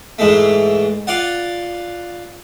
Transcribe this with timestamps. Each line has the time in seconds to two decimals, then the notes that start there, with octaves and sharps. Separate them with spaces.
0.19 G#2 E3 G#3 A3
1.07 F4 D5 F#5